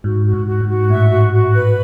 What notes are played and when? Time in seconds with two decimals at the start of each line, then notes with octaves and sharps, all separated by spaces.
0.04 G#2 F#4
0.26 F#4
0.33 G#2
0.47 F#4
0.61 G#2
0.69 F#4
0.90 A2 E5
1.10 F#4
1.33 F#4
1.53 B4